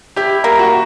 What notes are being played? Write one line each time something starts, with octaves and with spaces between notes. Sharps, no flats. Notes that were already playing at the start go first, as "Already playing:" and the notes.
E4 G4
A#3
F#4